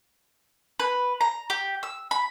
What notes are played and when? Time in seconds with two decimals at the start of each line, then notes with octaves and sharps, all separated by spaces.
0.79 B4
1.21 A#5
1.50 G4
1.83 E6
2.11 B5